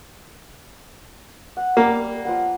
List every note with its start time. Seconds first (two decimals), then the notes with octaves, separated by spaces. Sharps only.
1.57 F#5
1.77 G3 A#3
2.25 F3 B4 F#5